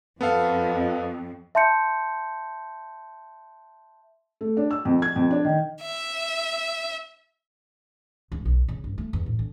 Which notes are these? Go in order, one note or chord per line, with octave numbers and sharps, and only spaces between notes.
F2 B3 A4 F5
E5 A5 C6 G6 C#7
A3
D4
E6
F2
G#6
F2
D4
D#3
E5
C#2
B1
C#3
G2
A3
E2
A2
D3